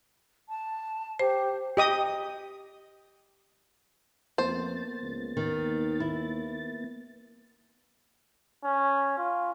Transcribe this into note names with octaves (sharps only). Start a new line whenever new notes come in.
A5
G4 C5
G4 D#5 D#6
F2 A#3 B3 C5 A6
C#2
D#2 D#3
E4
C#4
F4